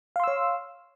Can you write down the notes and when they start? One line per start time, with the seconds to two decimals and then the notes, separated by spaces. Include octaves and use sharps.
0.16 F5
0.20 C6
0.24 E6
0.27 C#5